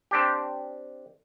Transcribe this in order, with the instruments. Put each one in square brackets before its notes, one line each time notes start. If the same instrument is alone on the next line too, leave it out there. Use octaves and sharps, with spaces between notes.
[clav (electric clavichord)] C4 D4 G4